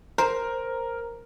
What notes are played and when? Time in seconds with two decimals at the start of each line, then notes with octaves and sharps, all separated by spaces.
0.18 A#4 C5